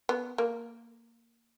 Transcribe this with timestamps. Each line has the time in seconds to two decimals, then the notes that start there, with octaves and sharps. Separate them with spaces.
0.09 B3
0.38 A#3